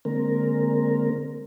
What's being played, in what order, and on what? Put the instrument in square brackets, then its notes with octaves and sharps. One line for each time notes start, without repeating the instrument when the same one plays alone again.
[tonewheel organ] D3 G#3 A#3 C4 A#4